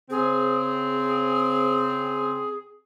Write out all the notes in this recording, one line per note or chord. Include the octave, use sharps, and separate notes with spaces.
C#3 C4 G#4